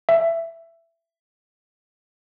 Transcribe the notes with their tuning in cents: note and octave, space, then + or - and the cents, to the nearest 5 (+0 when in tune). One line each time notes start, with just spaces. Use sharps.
E5 +15